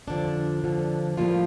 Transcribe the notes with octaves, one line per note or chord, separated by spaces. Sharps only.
F2 D3 F3 D4
F2 D3 F3
A2 F3 G3 A#3 F4